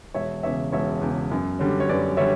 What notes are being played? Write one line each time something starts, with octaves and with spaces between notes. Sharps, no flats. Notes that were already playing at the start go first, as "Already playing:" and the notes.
E1 C#5 E5
E2 C#3 C#5 E5
E1 C#5 E5
E2 C#3
F#2
D3 G3 C#4
C#5
F#2 B4 D5
D3 G3 C#4 C#5 E5